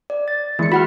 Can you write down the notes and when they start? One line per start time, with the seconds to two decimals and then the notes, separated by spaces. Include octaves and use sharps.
0.10 D5
0.28 A6
0.59 E3 G#3 A#3 C#7
0.72 F#4 F#5 B5 F6